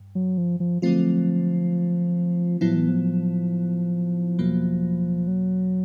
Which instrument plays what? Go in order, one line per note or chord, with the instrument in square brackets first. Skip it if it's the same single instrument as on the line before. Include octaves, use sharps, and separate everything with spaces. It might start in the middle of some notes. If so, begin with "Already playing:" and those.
Already playing: [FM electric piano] G2
[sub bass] F#3
F3
F3
[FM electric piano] D3 F#3 A3 C4 F4 [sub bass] F3
[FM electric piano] A2 F#3 B3 E4 [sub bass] F3
[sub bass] E3
F3
[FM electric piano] E2 B2 F#3 A#3
[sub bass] F#3